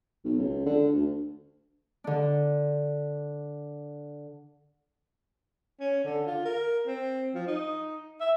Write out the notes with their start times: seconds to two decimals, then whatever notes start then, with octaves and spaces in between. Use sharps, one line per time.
0.24 B1
0.38 C#2
0.66 D3
0.93 D2
2.04 D3 D4
5.80 C#4
6.04 D3
6.26 F4
6.45 A#4
6.87 C4
7.34 F3
7.47 D#4
8.20 E5